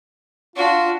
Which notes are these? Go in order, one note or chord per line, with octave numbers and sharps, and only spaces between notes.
D4 F4 F#4